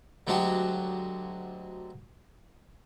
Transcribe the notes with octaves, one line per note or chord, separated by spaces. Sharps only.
D2 F#3 G#3 D4 F#4 G4